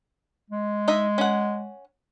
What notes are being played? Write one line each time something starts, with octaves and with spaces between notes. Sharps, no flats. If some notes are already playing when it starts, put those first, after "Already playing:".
G#3
D#4 D#5 E5
C#4 F#5